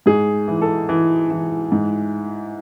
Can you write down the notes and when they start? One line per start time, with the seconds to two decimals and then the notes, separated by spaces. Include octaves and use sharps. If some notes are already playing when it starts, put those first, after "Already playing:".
0.06 G#2 G#4
0.48 E3
0.62 A4
0.89 E3
1.31 E3
1.72 G#2